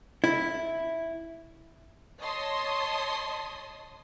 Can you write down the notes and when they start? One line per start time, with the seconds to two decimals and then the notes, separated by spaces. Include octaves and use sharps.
0.24 E4
2.21 C#5 D#5 A5 C6 D#6